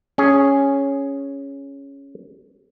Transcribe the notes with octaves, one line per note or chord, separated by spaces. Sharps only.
C#4 G#4